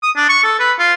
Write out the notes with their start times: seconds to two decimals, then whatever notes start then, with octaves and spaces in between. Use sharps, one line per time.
0.03 D#6
0.16 D4
0.29 C#6
0.44 A4
0.59 B4
0.79 F4